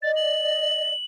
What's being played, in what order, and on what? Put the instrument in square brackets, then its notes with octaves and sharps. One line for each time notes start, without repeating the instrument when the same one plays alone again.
[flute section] D5 D#5 [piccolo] A6
[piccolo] F#7